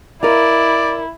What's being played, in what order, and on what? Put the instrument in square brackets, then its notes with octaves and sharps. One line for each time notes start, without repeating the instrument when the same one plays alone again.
[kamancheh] E4 [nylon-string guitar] A#4 D#5 F5 [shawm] D5